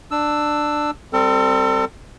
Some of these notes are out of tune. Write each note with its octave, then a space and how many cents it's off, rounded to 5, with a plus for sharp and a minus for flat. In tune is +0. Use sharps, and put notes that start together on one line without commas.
D4 +15 E6 +0
G3 +0 C4 +0 A4 +35